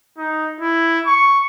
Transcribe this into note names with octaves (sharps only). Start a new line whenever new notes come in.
D#4
E4
C#6